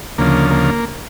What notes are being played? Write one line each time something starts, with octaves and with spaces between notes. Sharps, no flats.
D2 C#3 F3 A#3
A#3